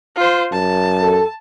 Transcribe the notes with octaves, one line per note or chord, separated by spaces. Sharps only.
F4 C5
F#2 A5
A4